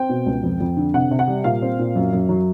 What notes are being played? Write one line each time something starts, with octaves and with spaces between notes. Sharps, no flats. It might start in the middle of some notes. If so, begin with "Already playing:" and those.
Already playing: C4 G5
B2
C#2
F2
F2
D3
C3 F#5
C3
F#5
G3
A#2 F5
C4
A#2
F#2
F#2
F#3